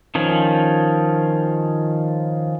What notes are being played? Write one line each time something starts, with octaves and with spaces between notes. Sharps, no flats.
D#3 F3 C#4